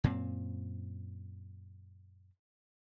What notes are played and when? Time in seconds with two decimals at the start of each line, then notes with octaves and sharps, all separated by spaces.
0.04 F#2 A#2 C4